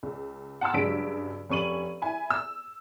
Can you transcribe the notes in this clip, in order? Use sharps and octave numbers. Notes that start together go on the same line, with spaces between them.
C#2
F#5 A5 C6 E6
G2 C#3 F#3 G#3 B6 D7
F1 C#4 C#6 D#7 F#7
E4 G#5 B5
E6